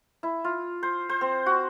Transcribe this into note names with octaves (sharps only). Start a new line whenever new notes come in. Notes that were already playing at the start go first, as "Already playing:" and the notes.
E4
F4
C5
C5
C4
F#4